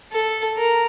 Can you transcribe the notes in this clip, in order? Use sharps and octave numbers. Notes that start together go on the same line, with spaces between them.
A4
A#4